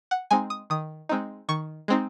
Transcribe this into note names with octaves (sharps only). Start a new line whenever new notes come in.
F#5
G#3 C4 D#4 G#5
D#6
D#3 D#6
G#3 C4 D#4
D#3 C#6
G#3 C4 D#4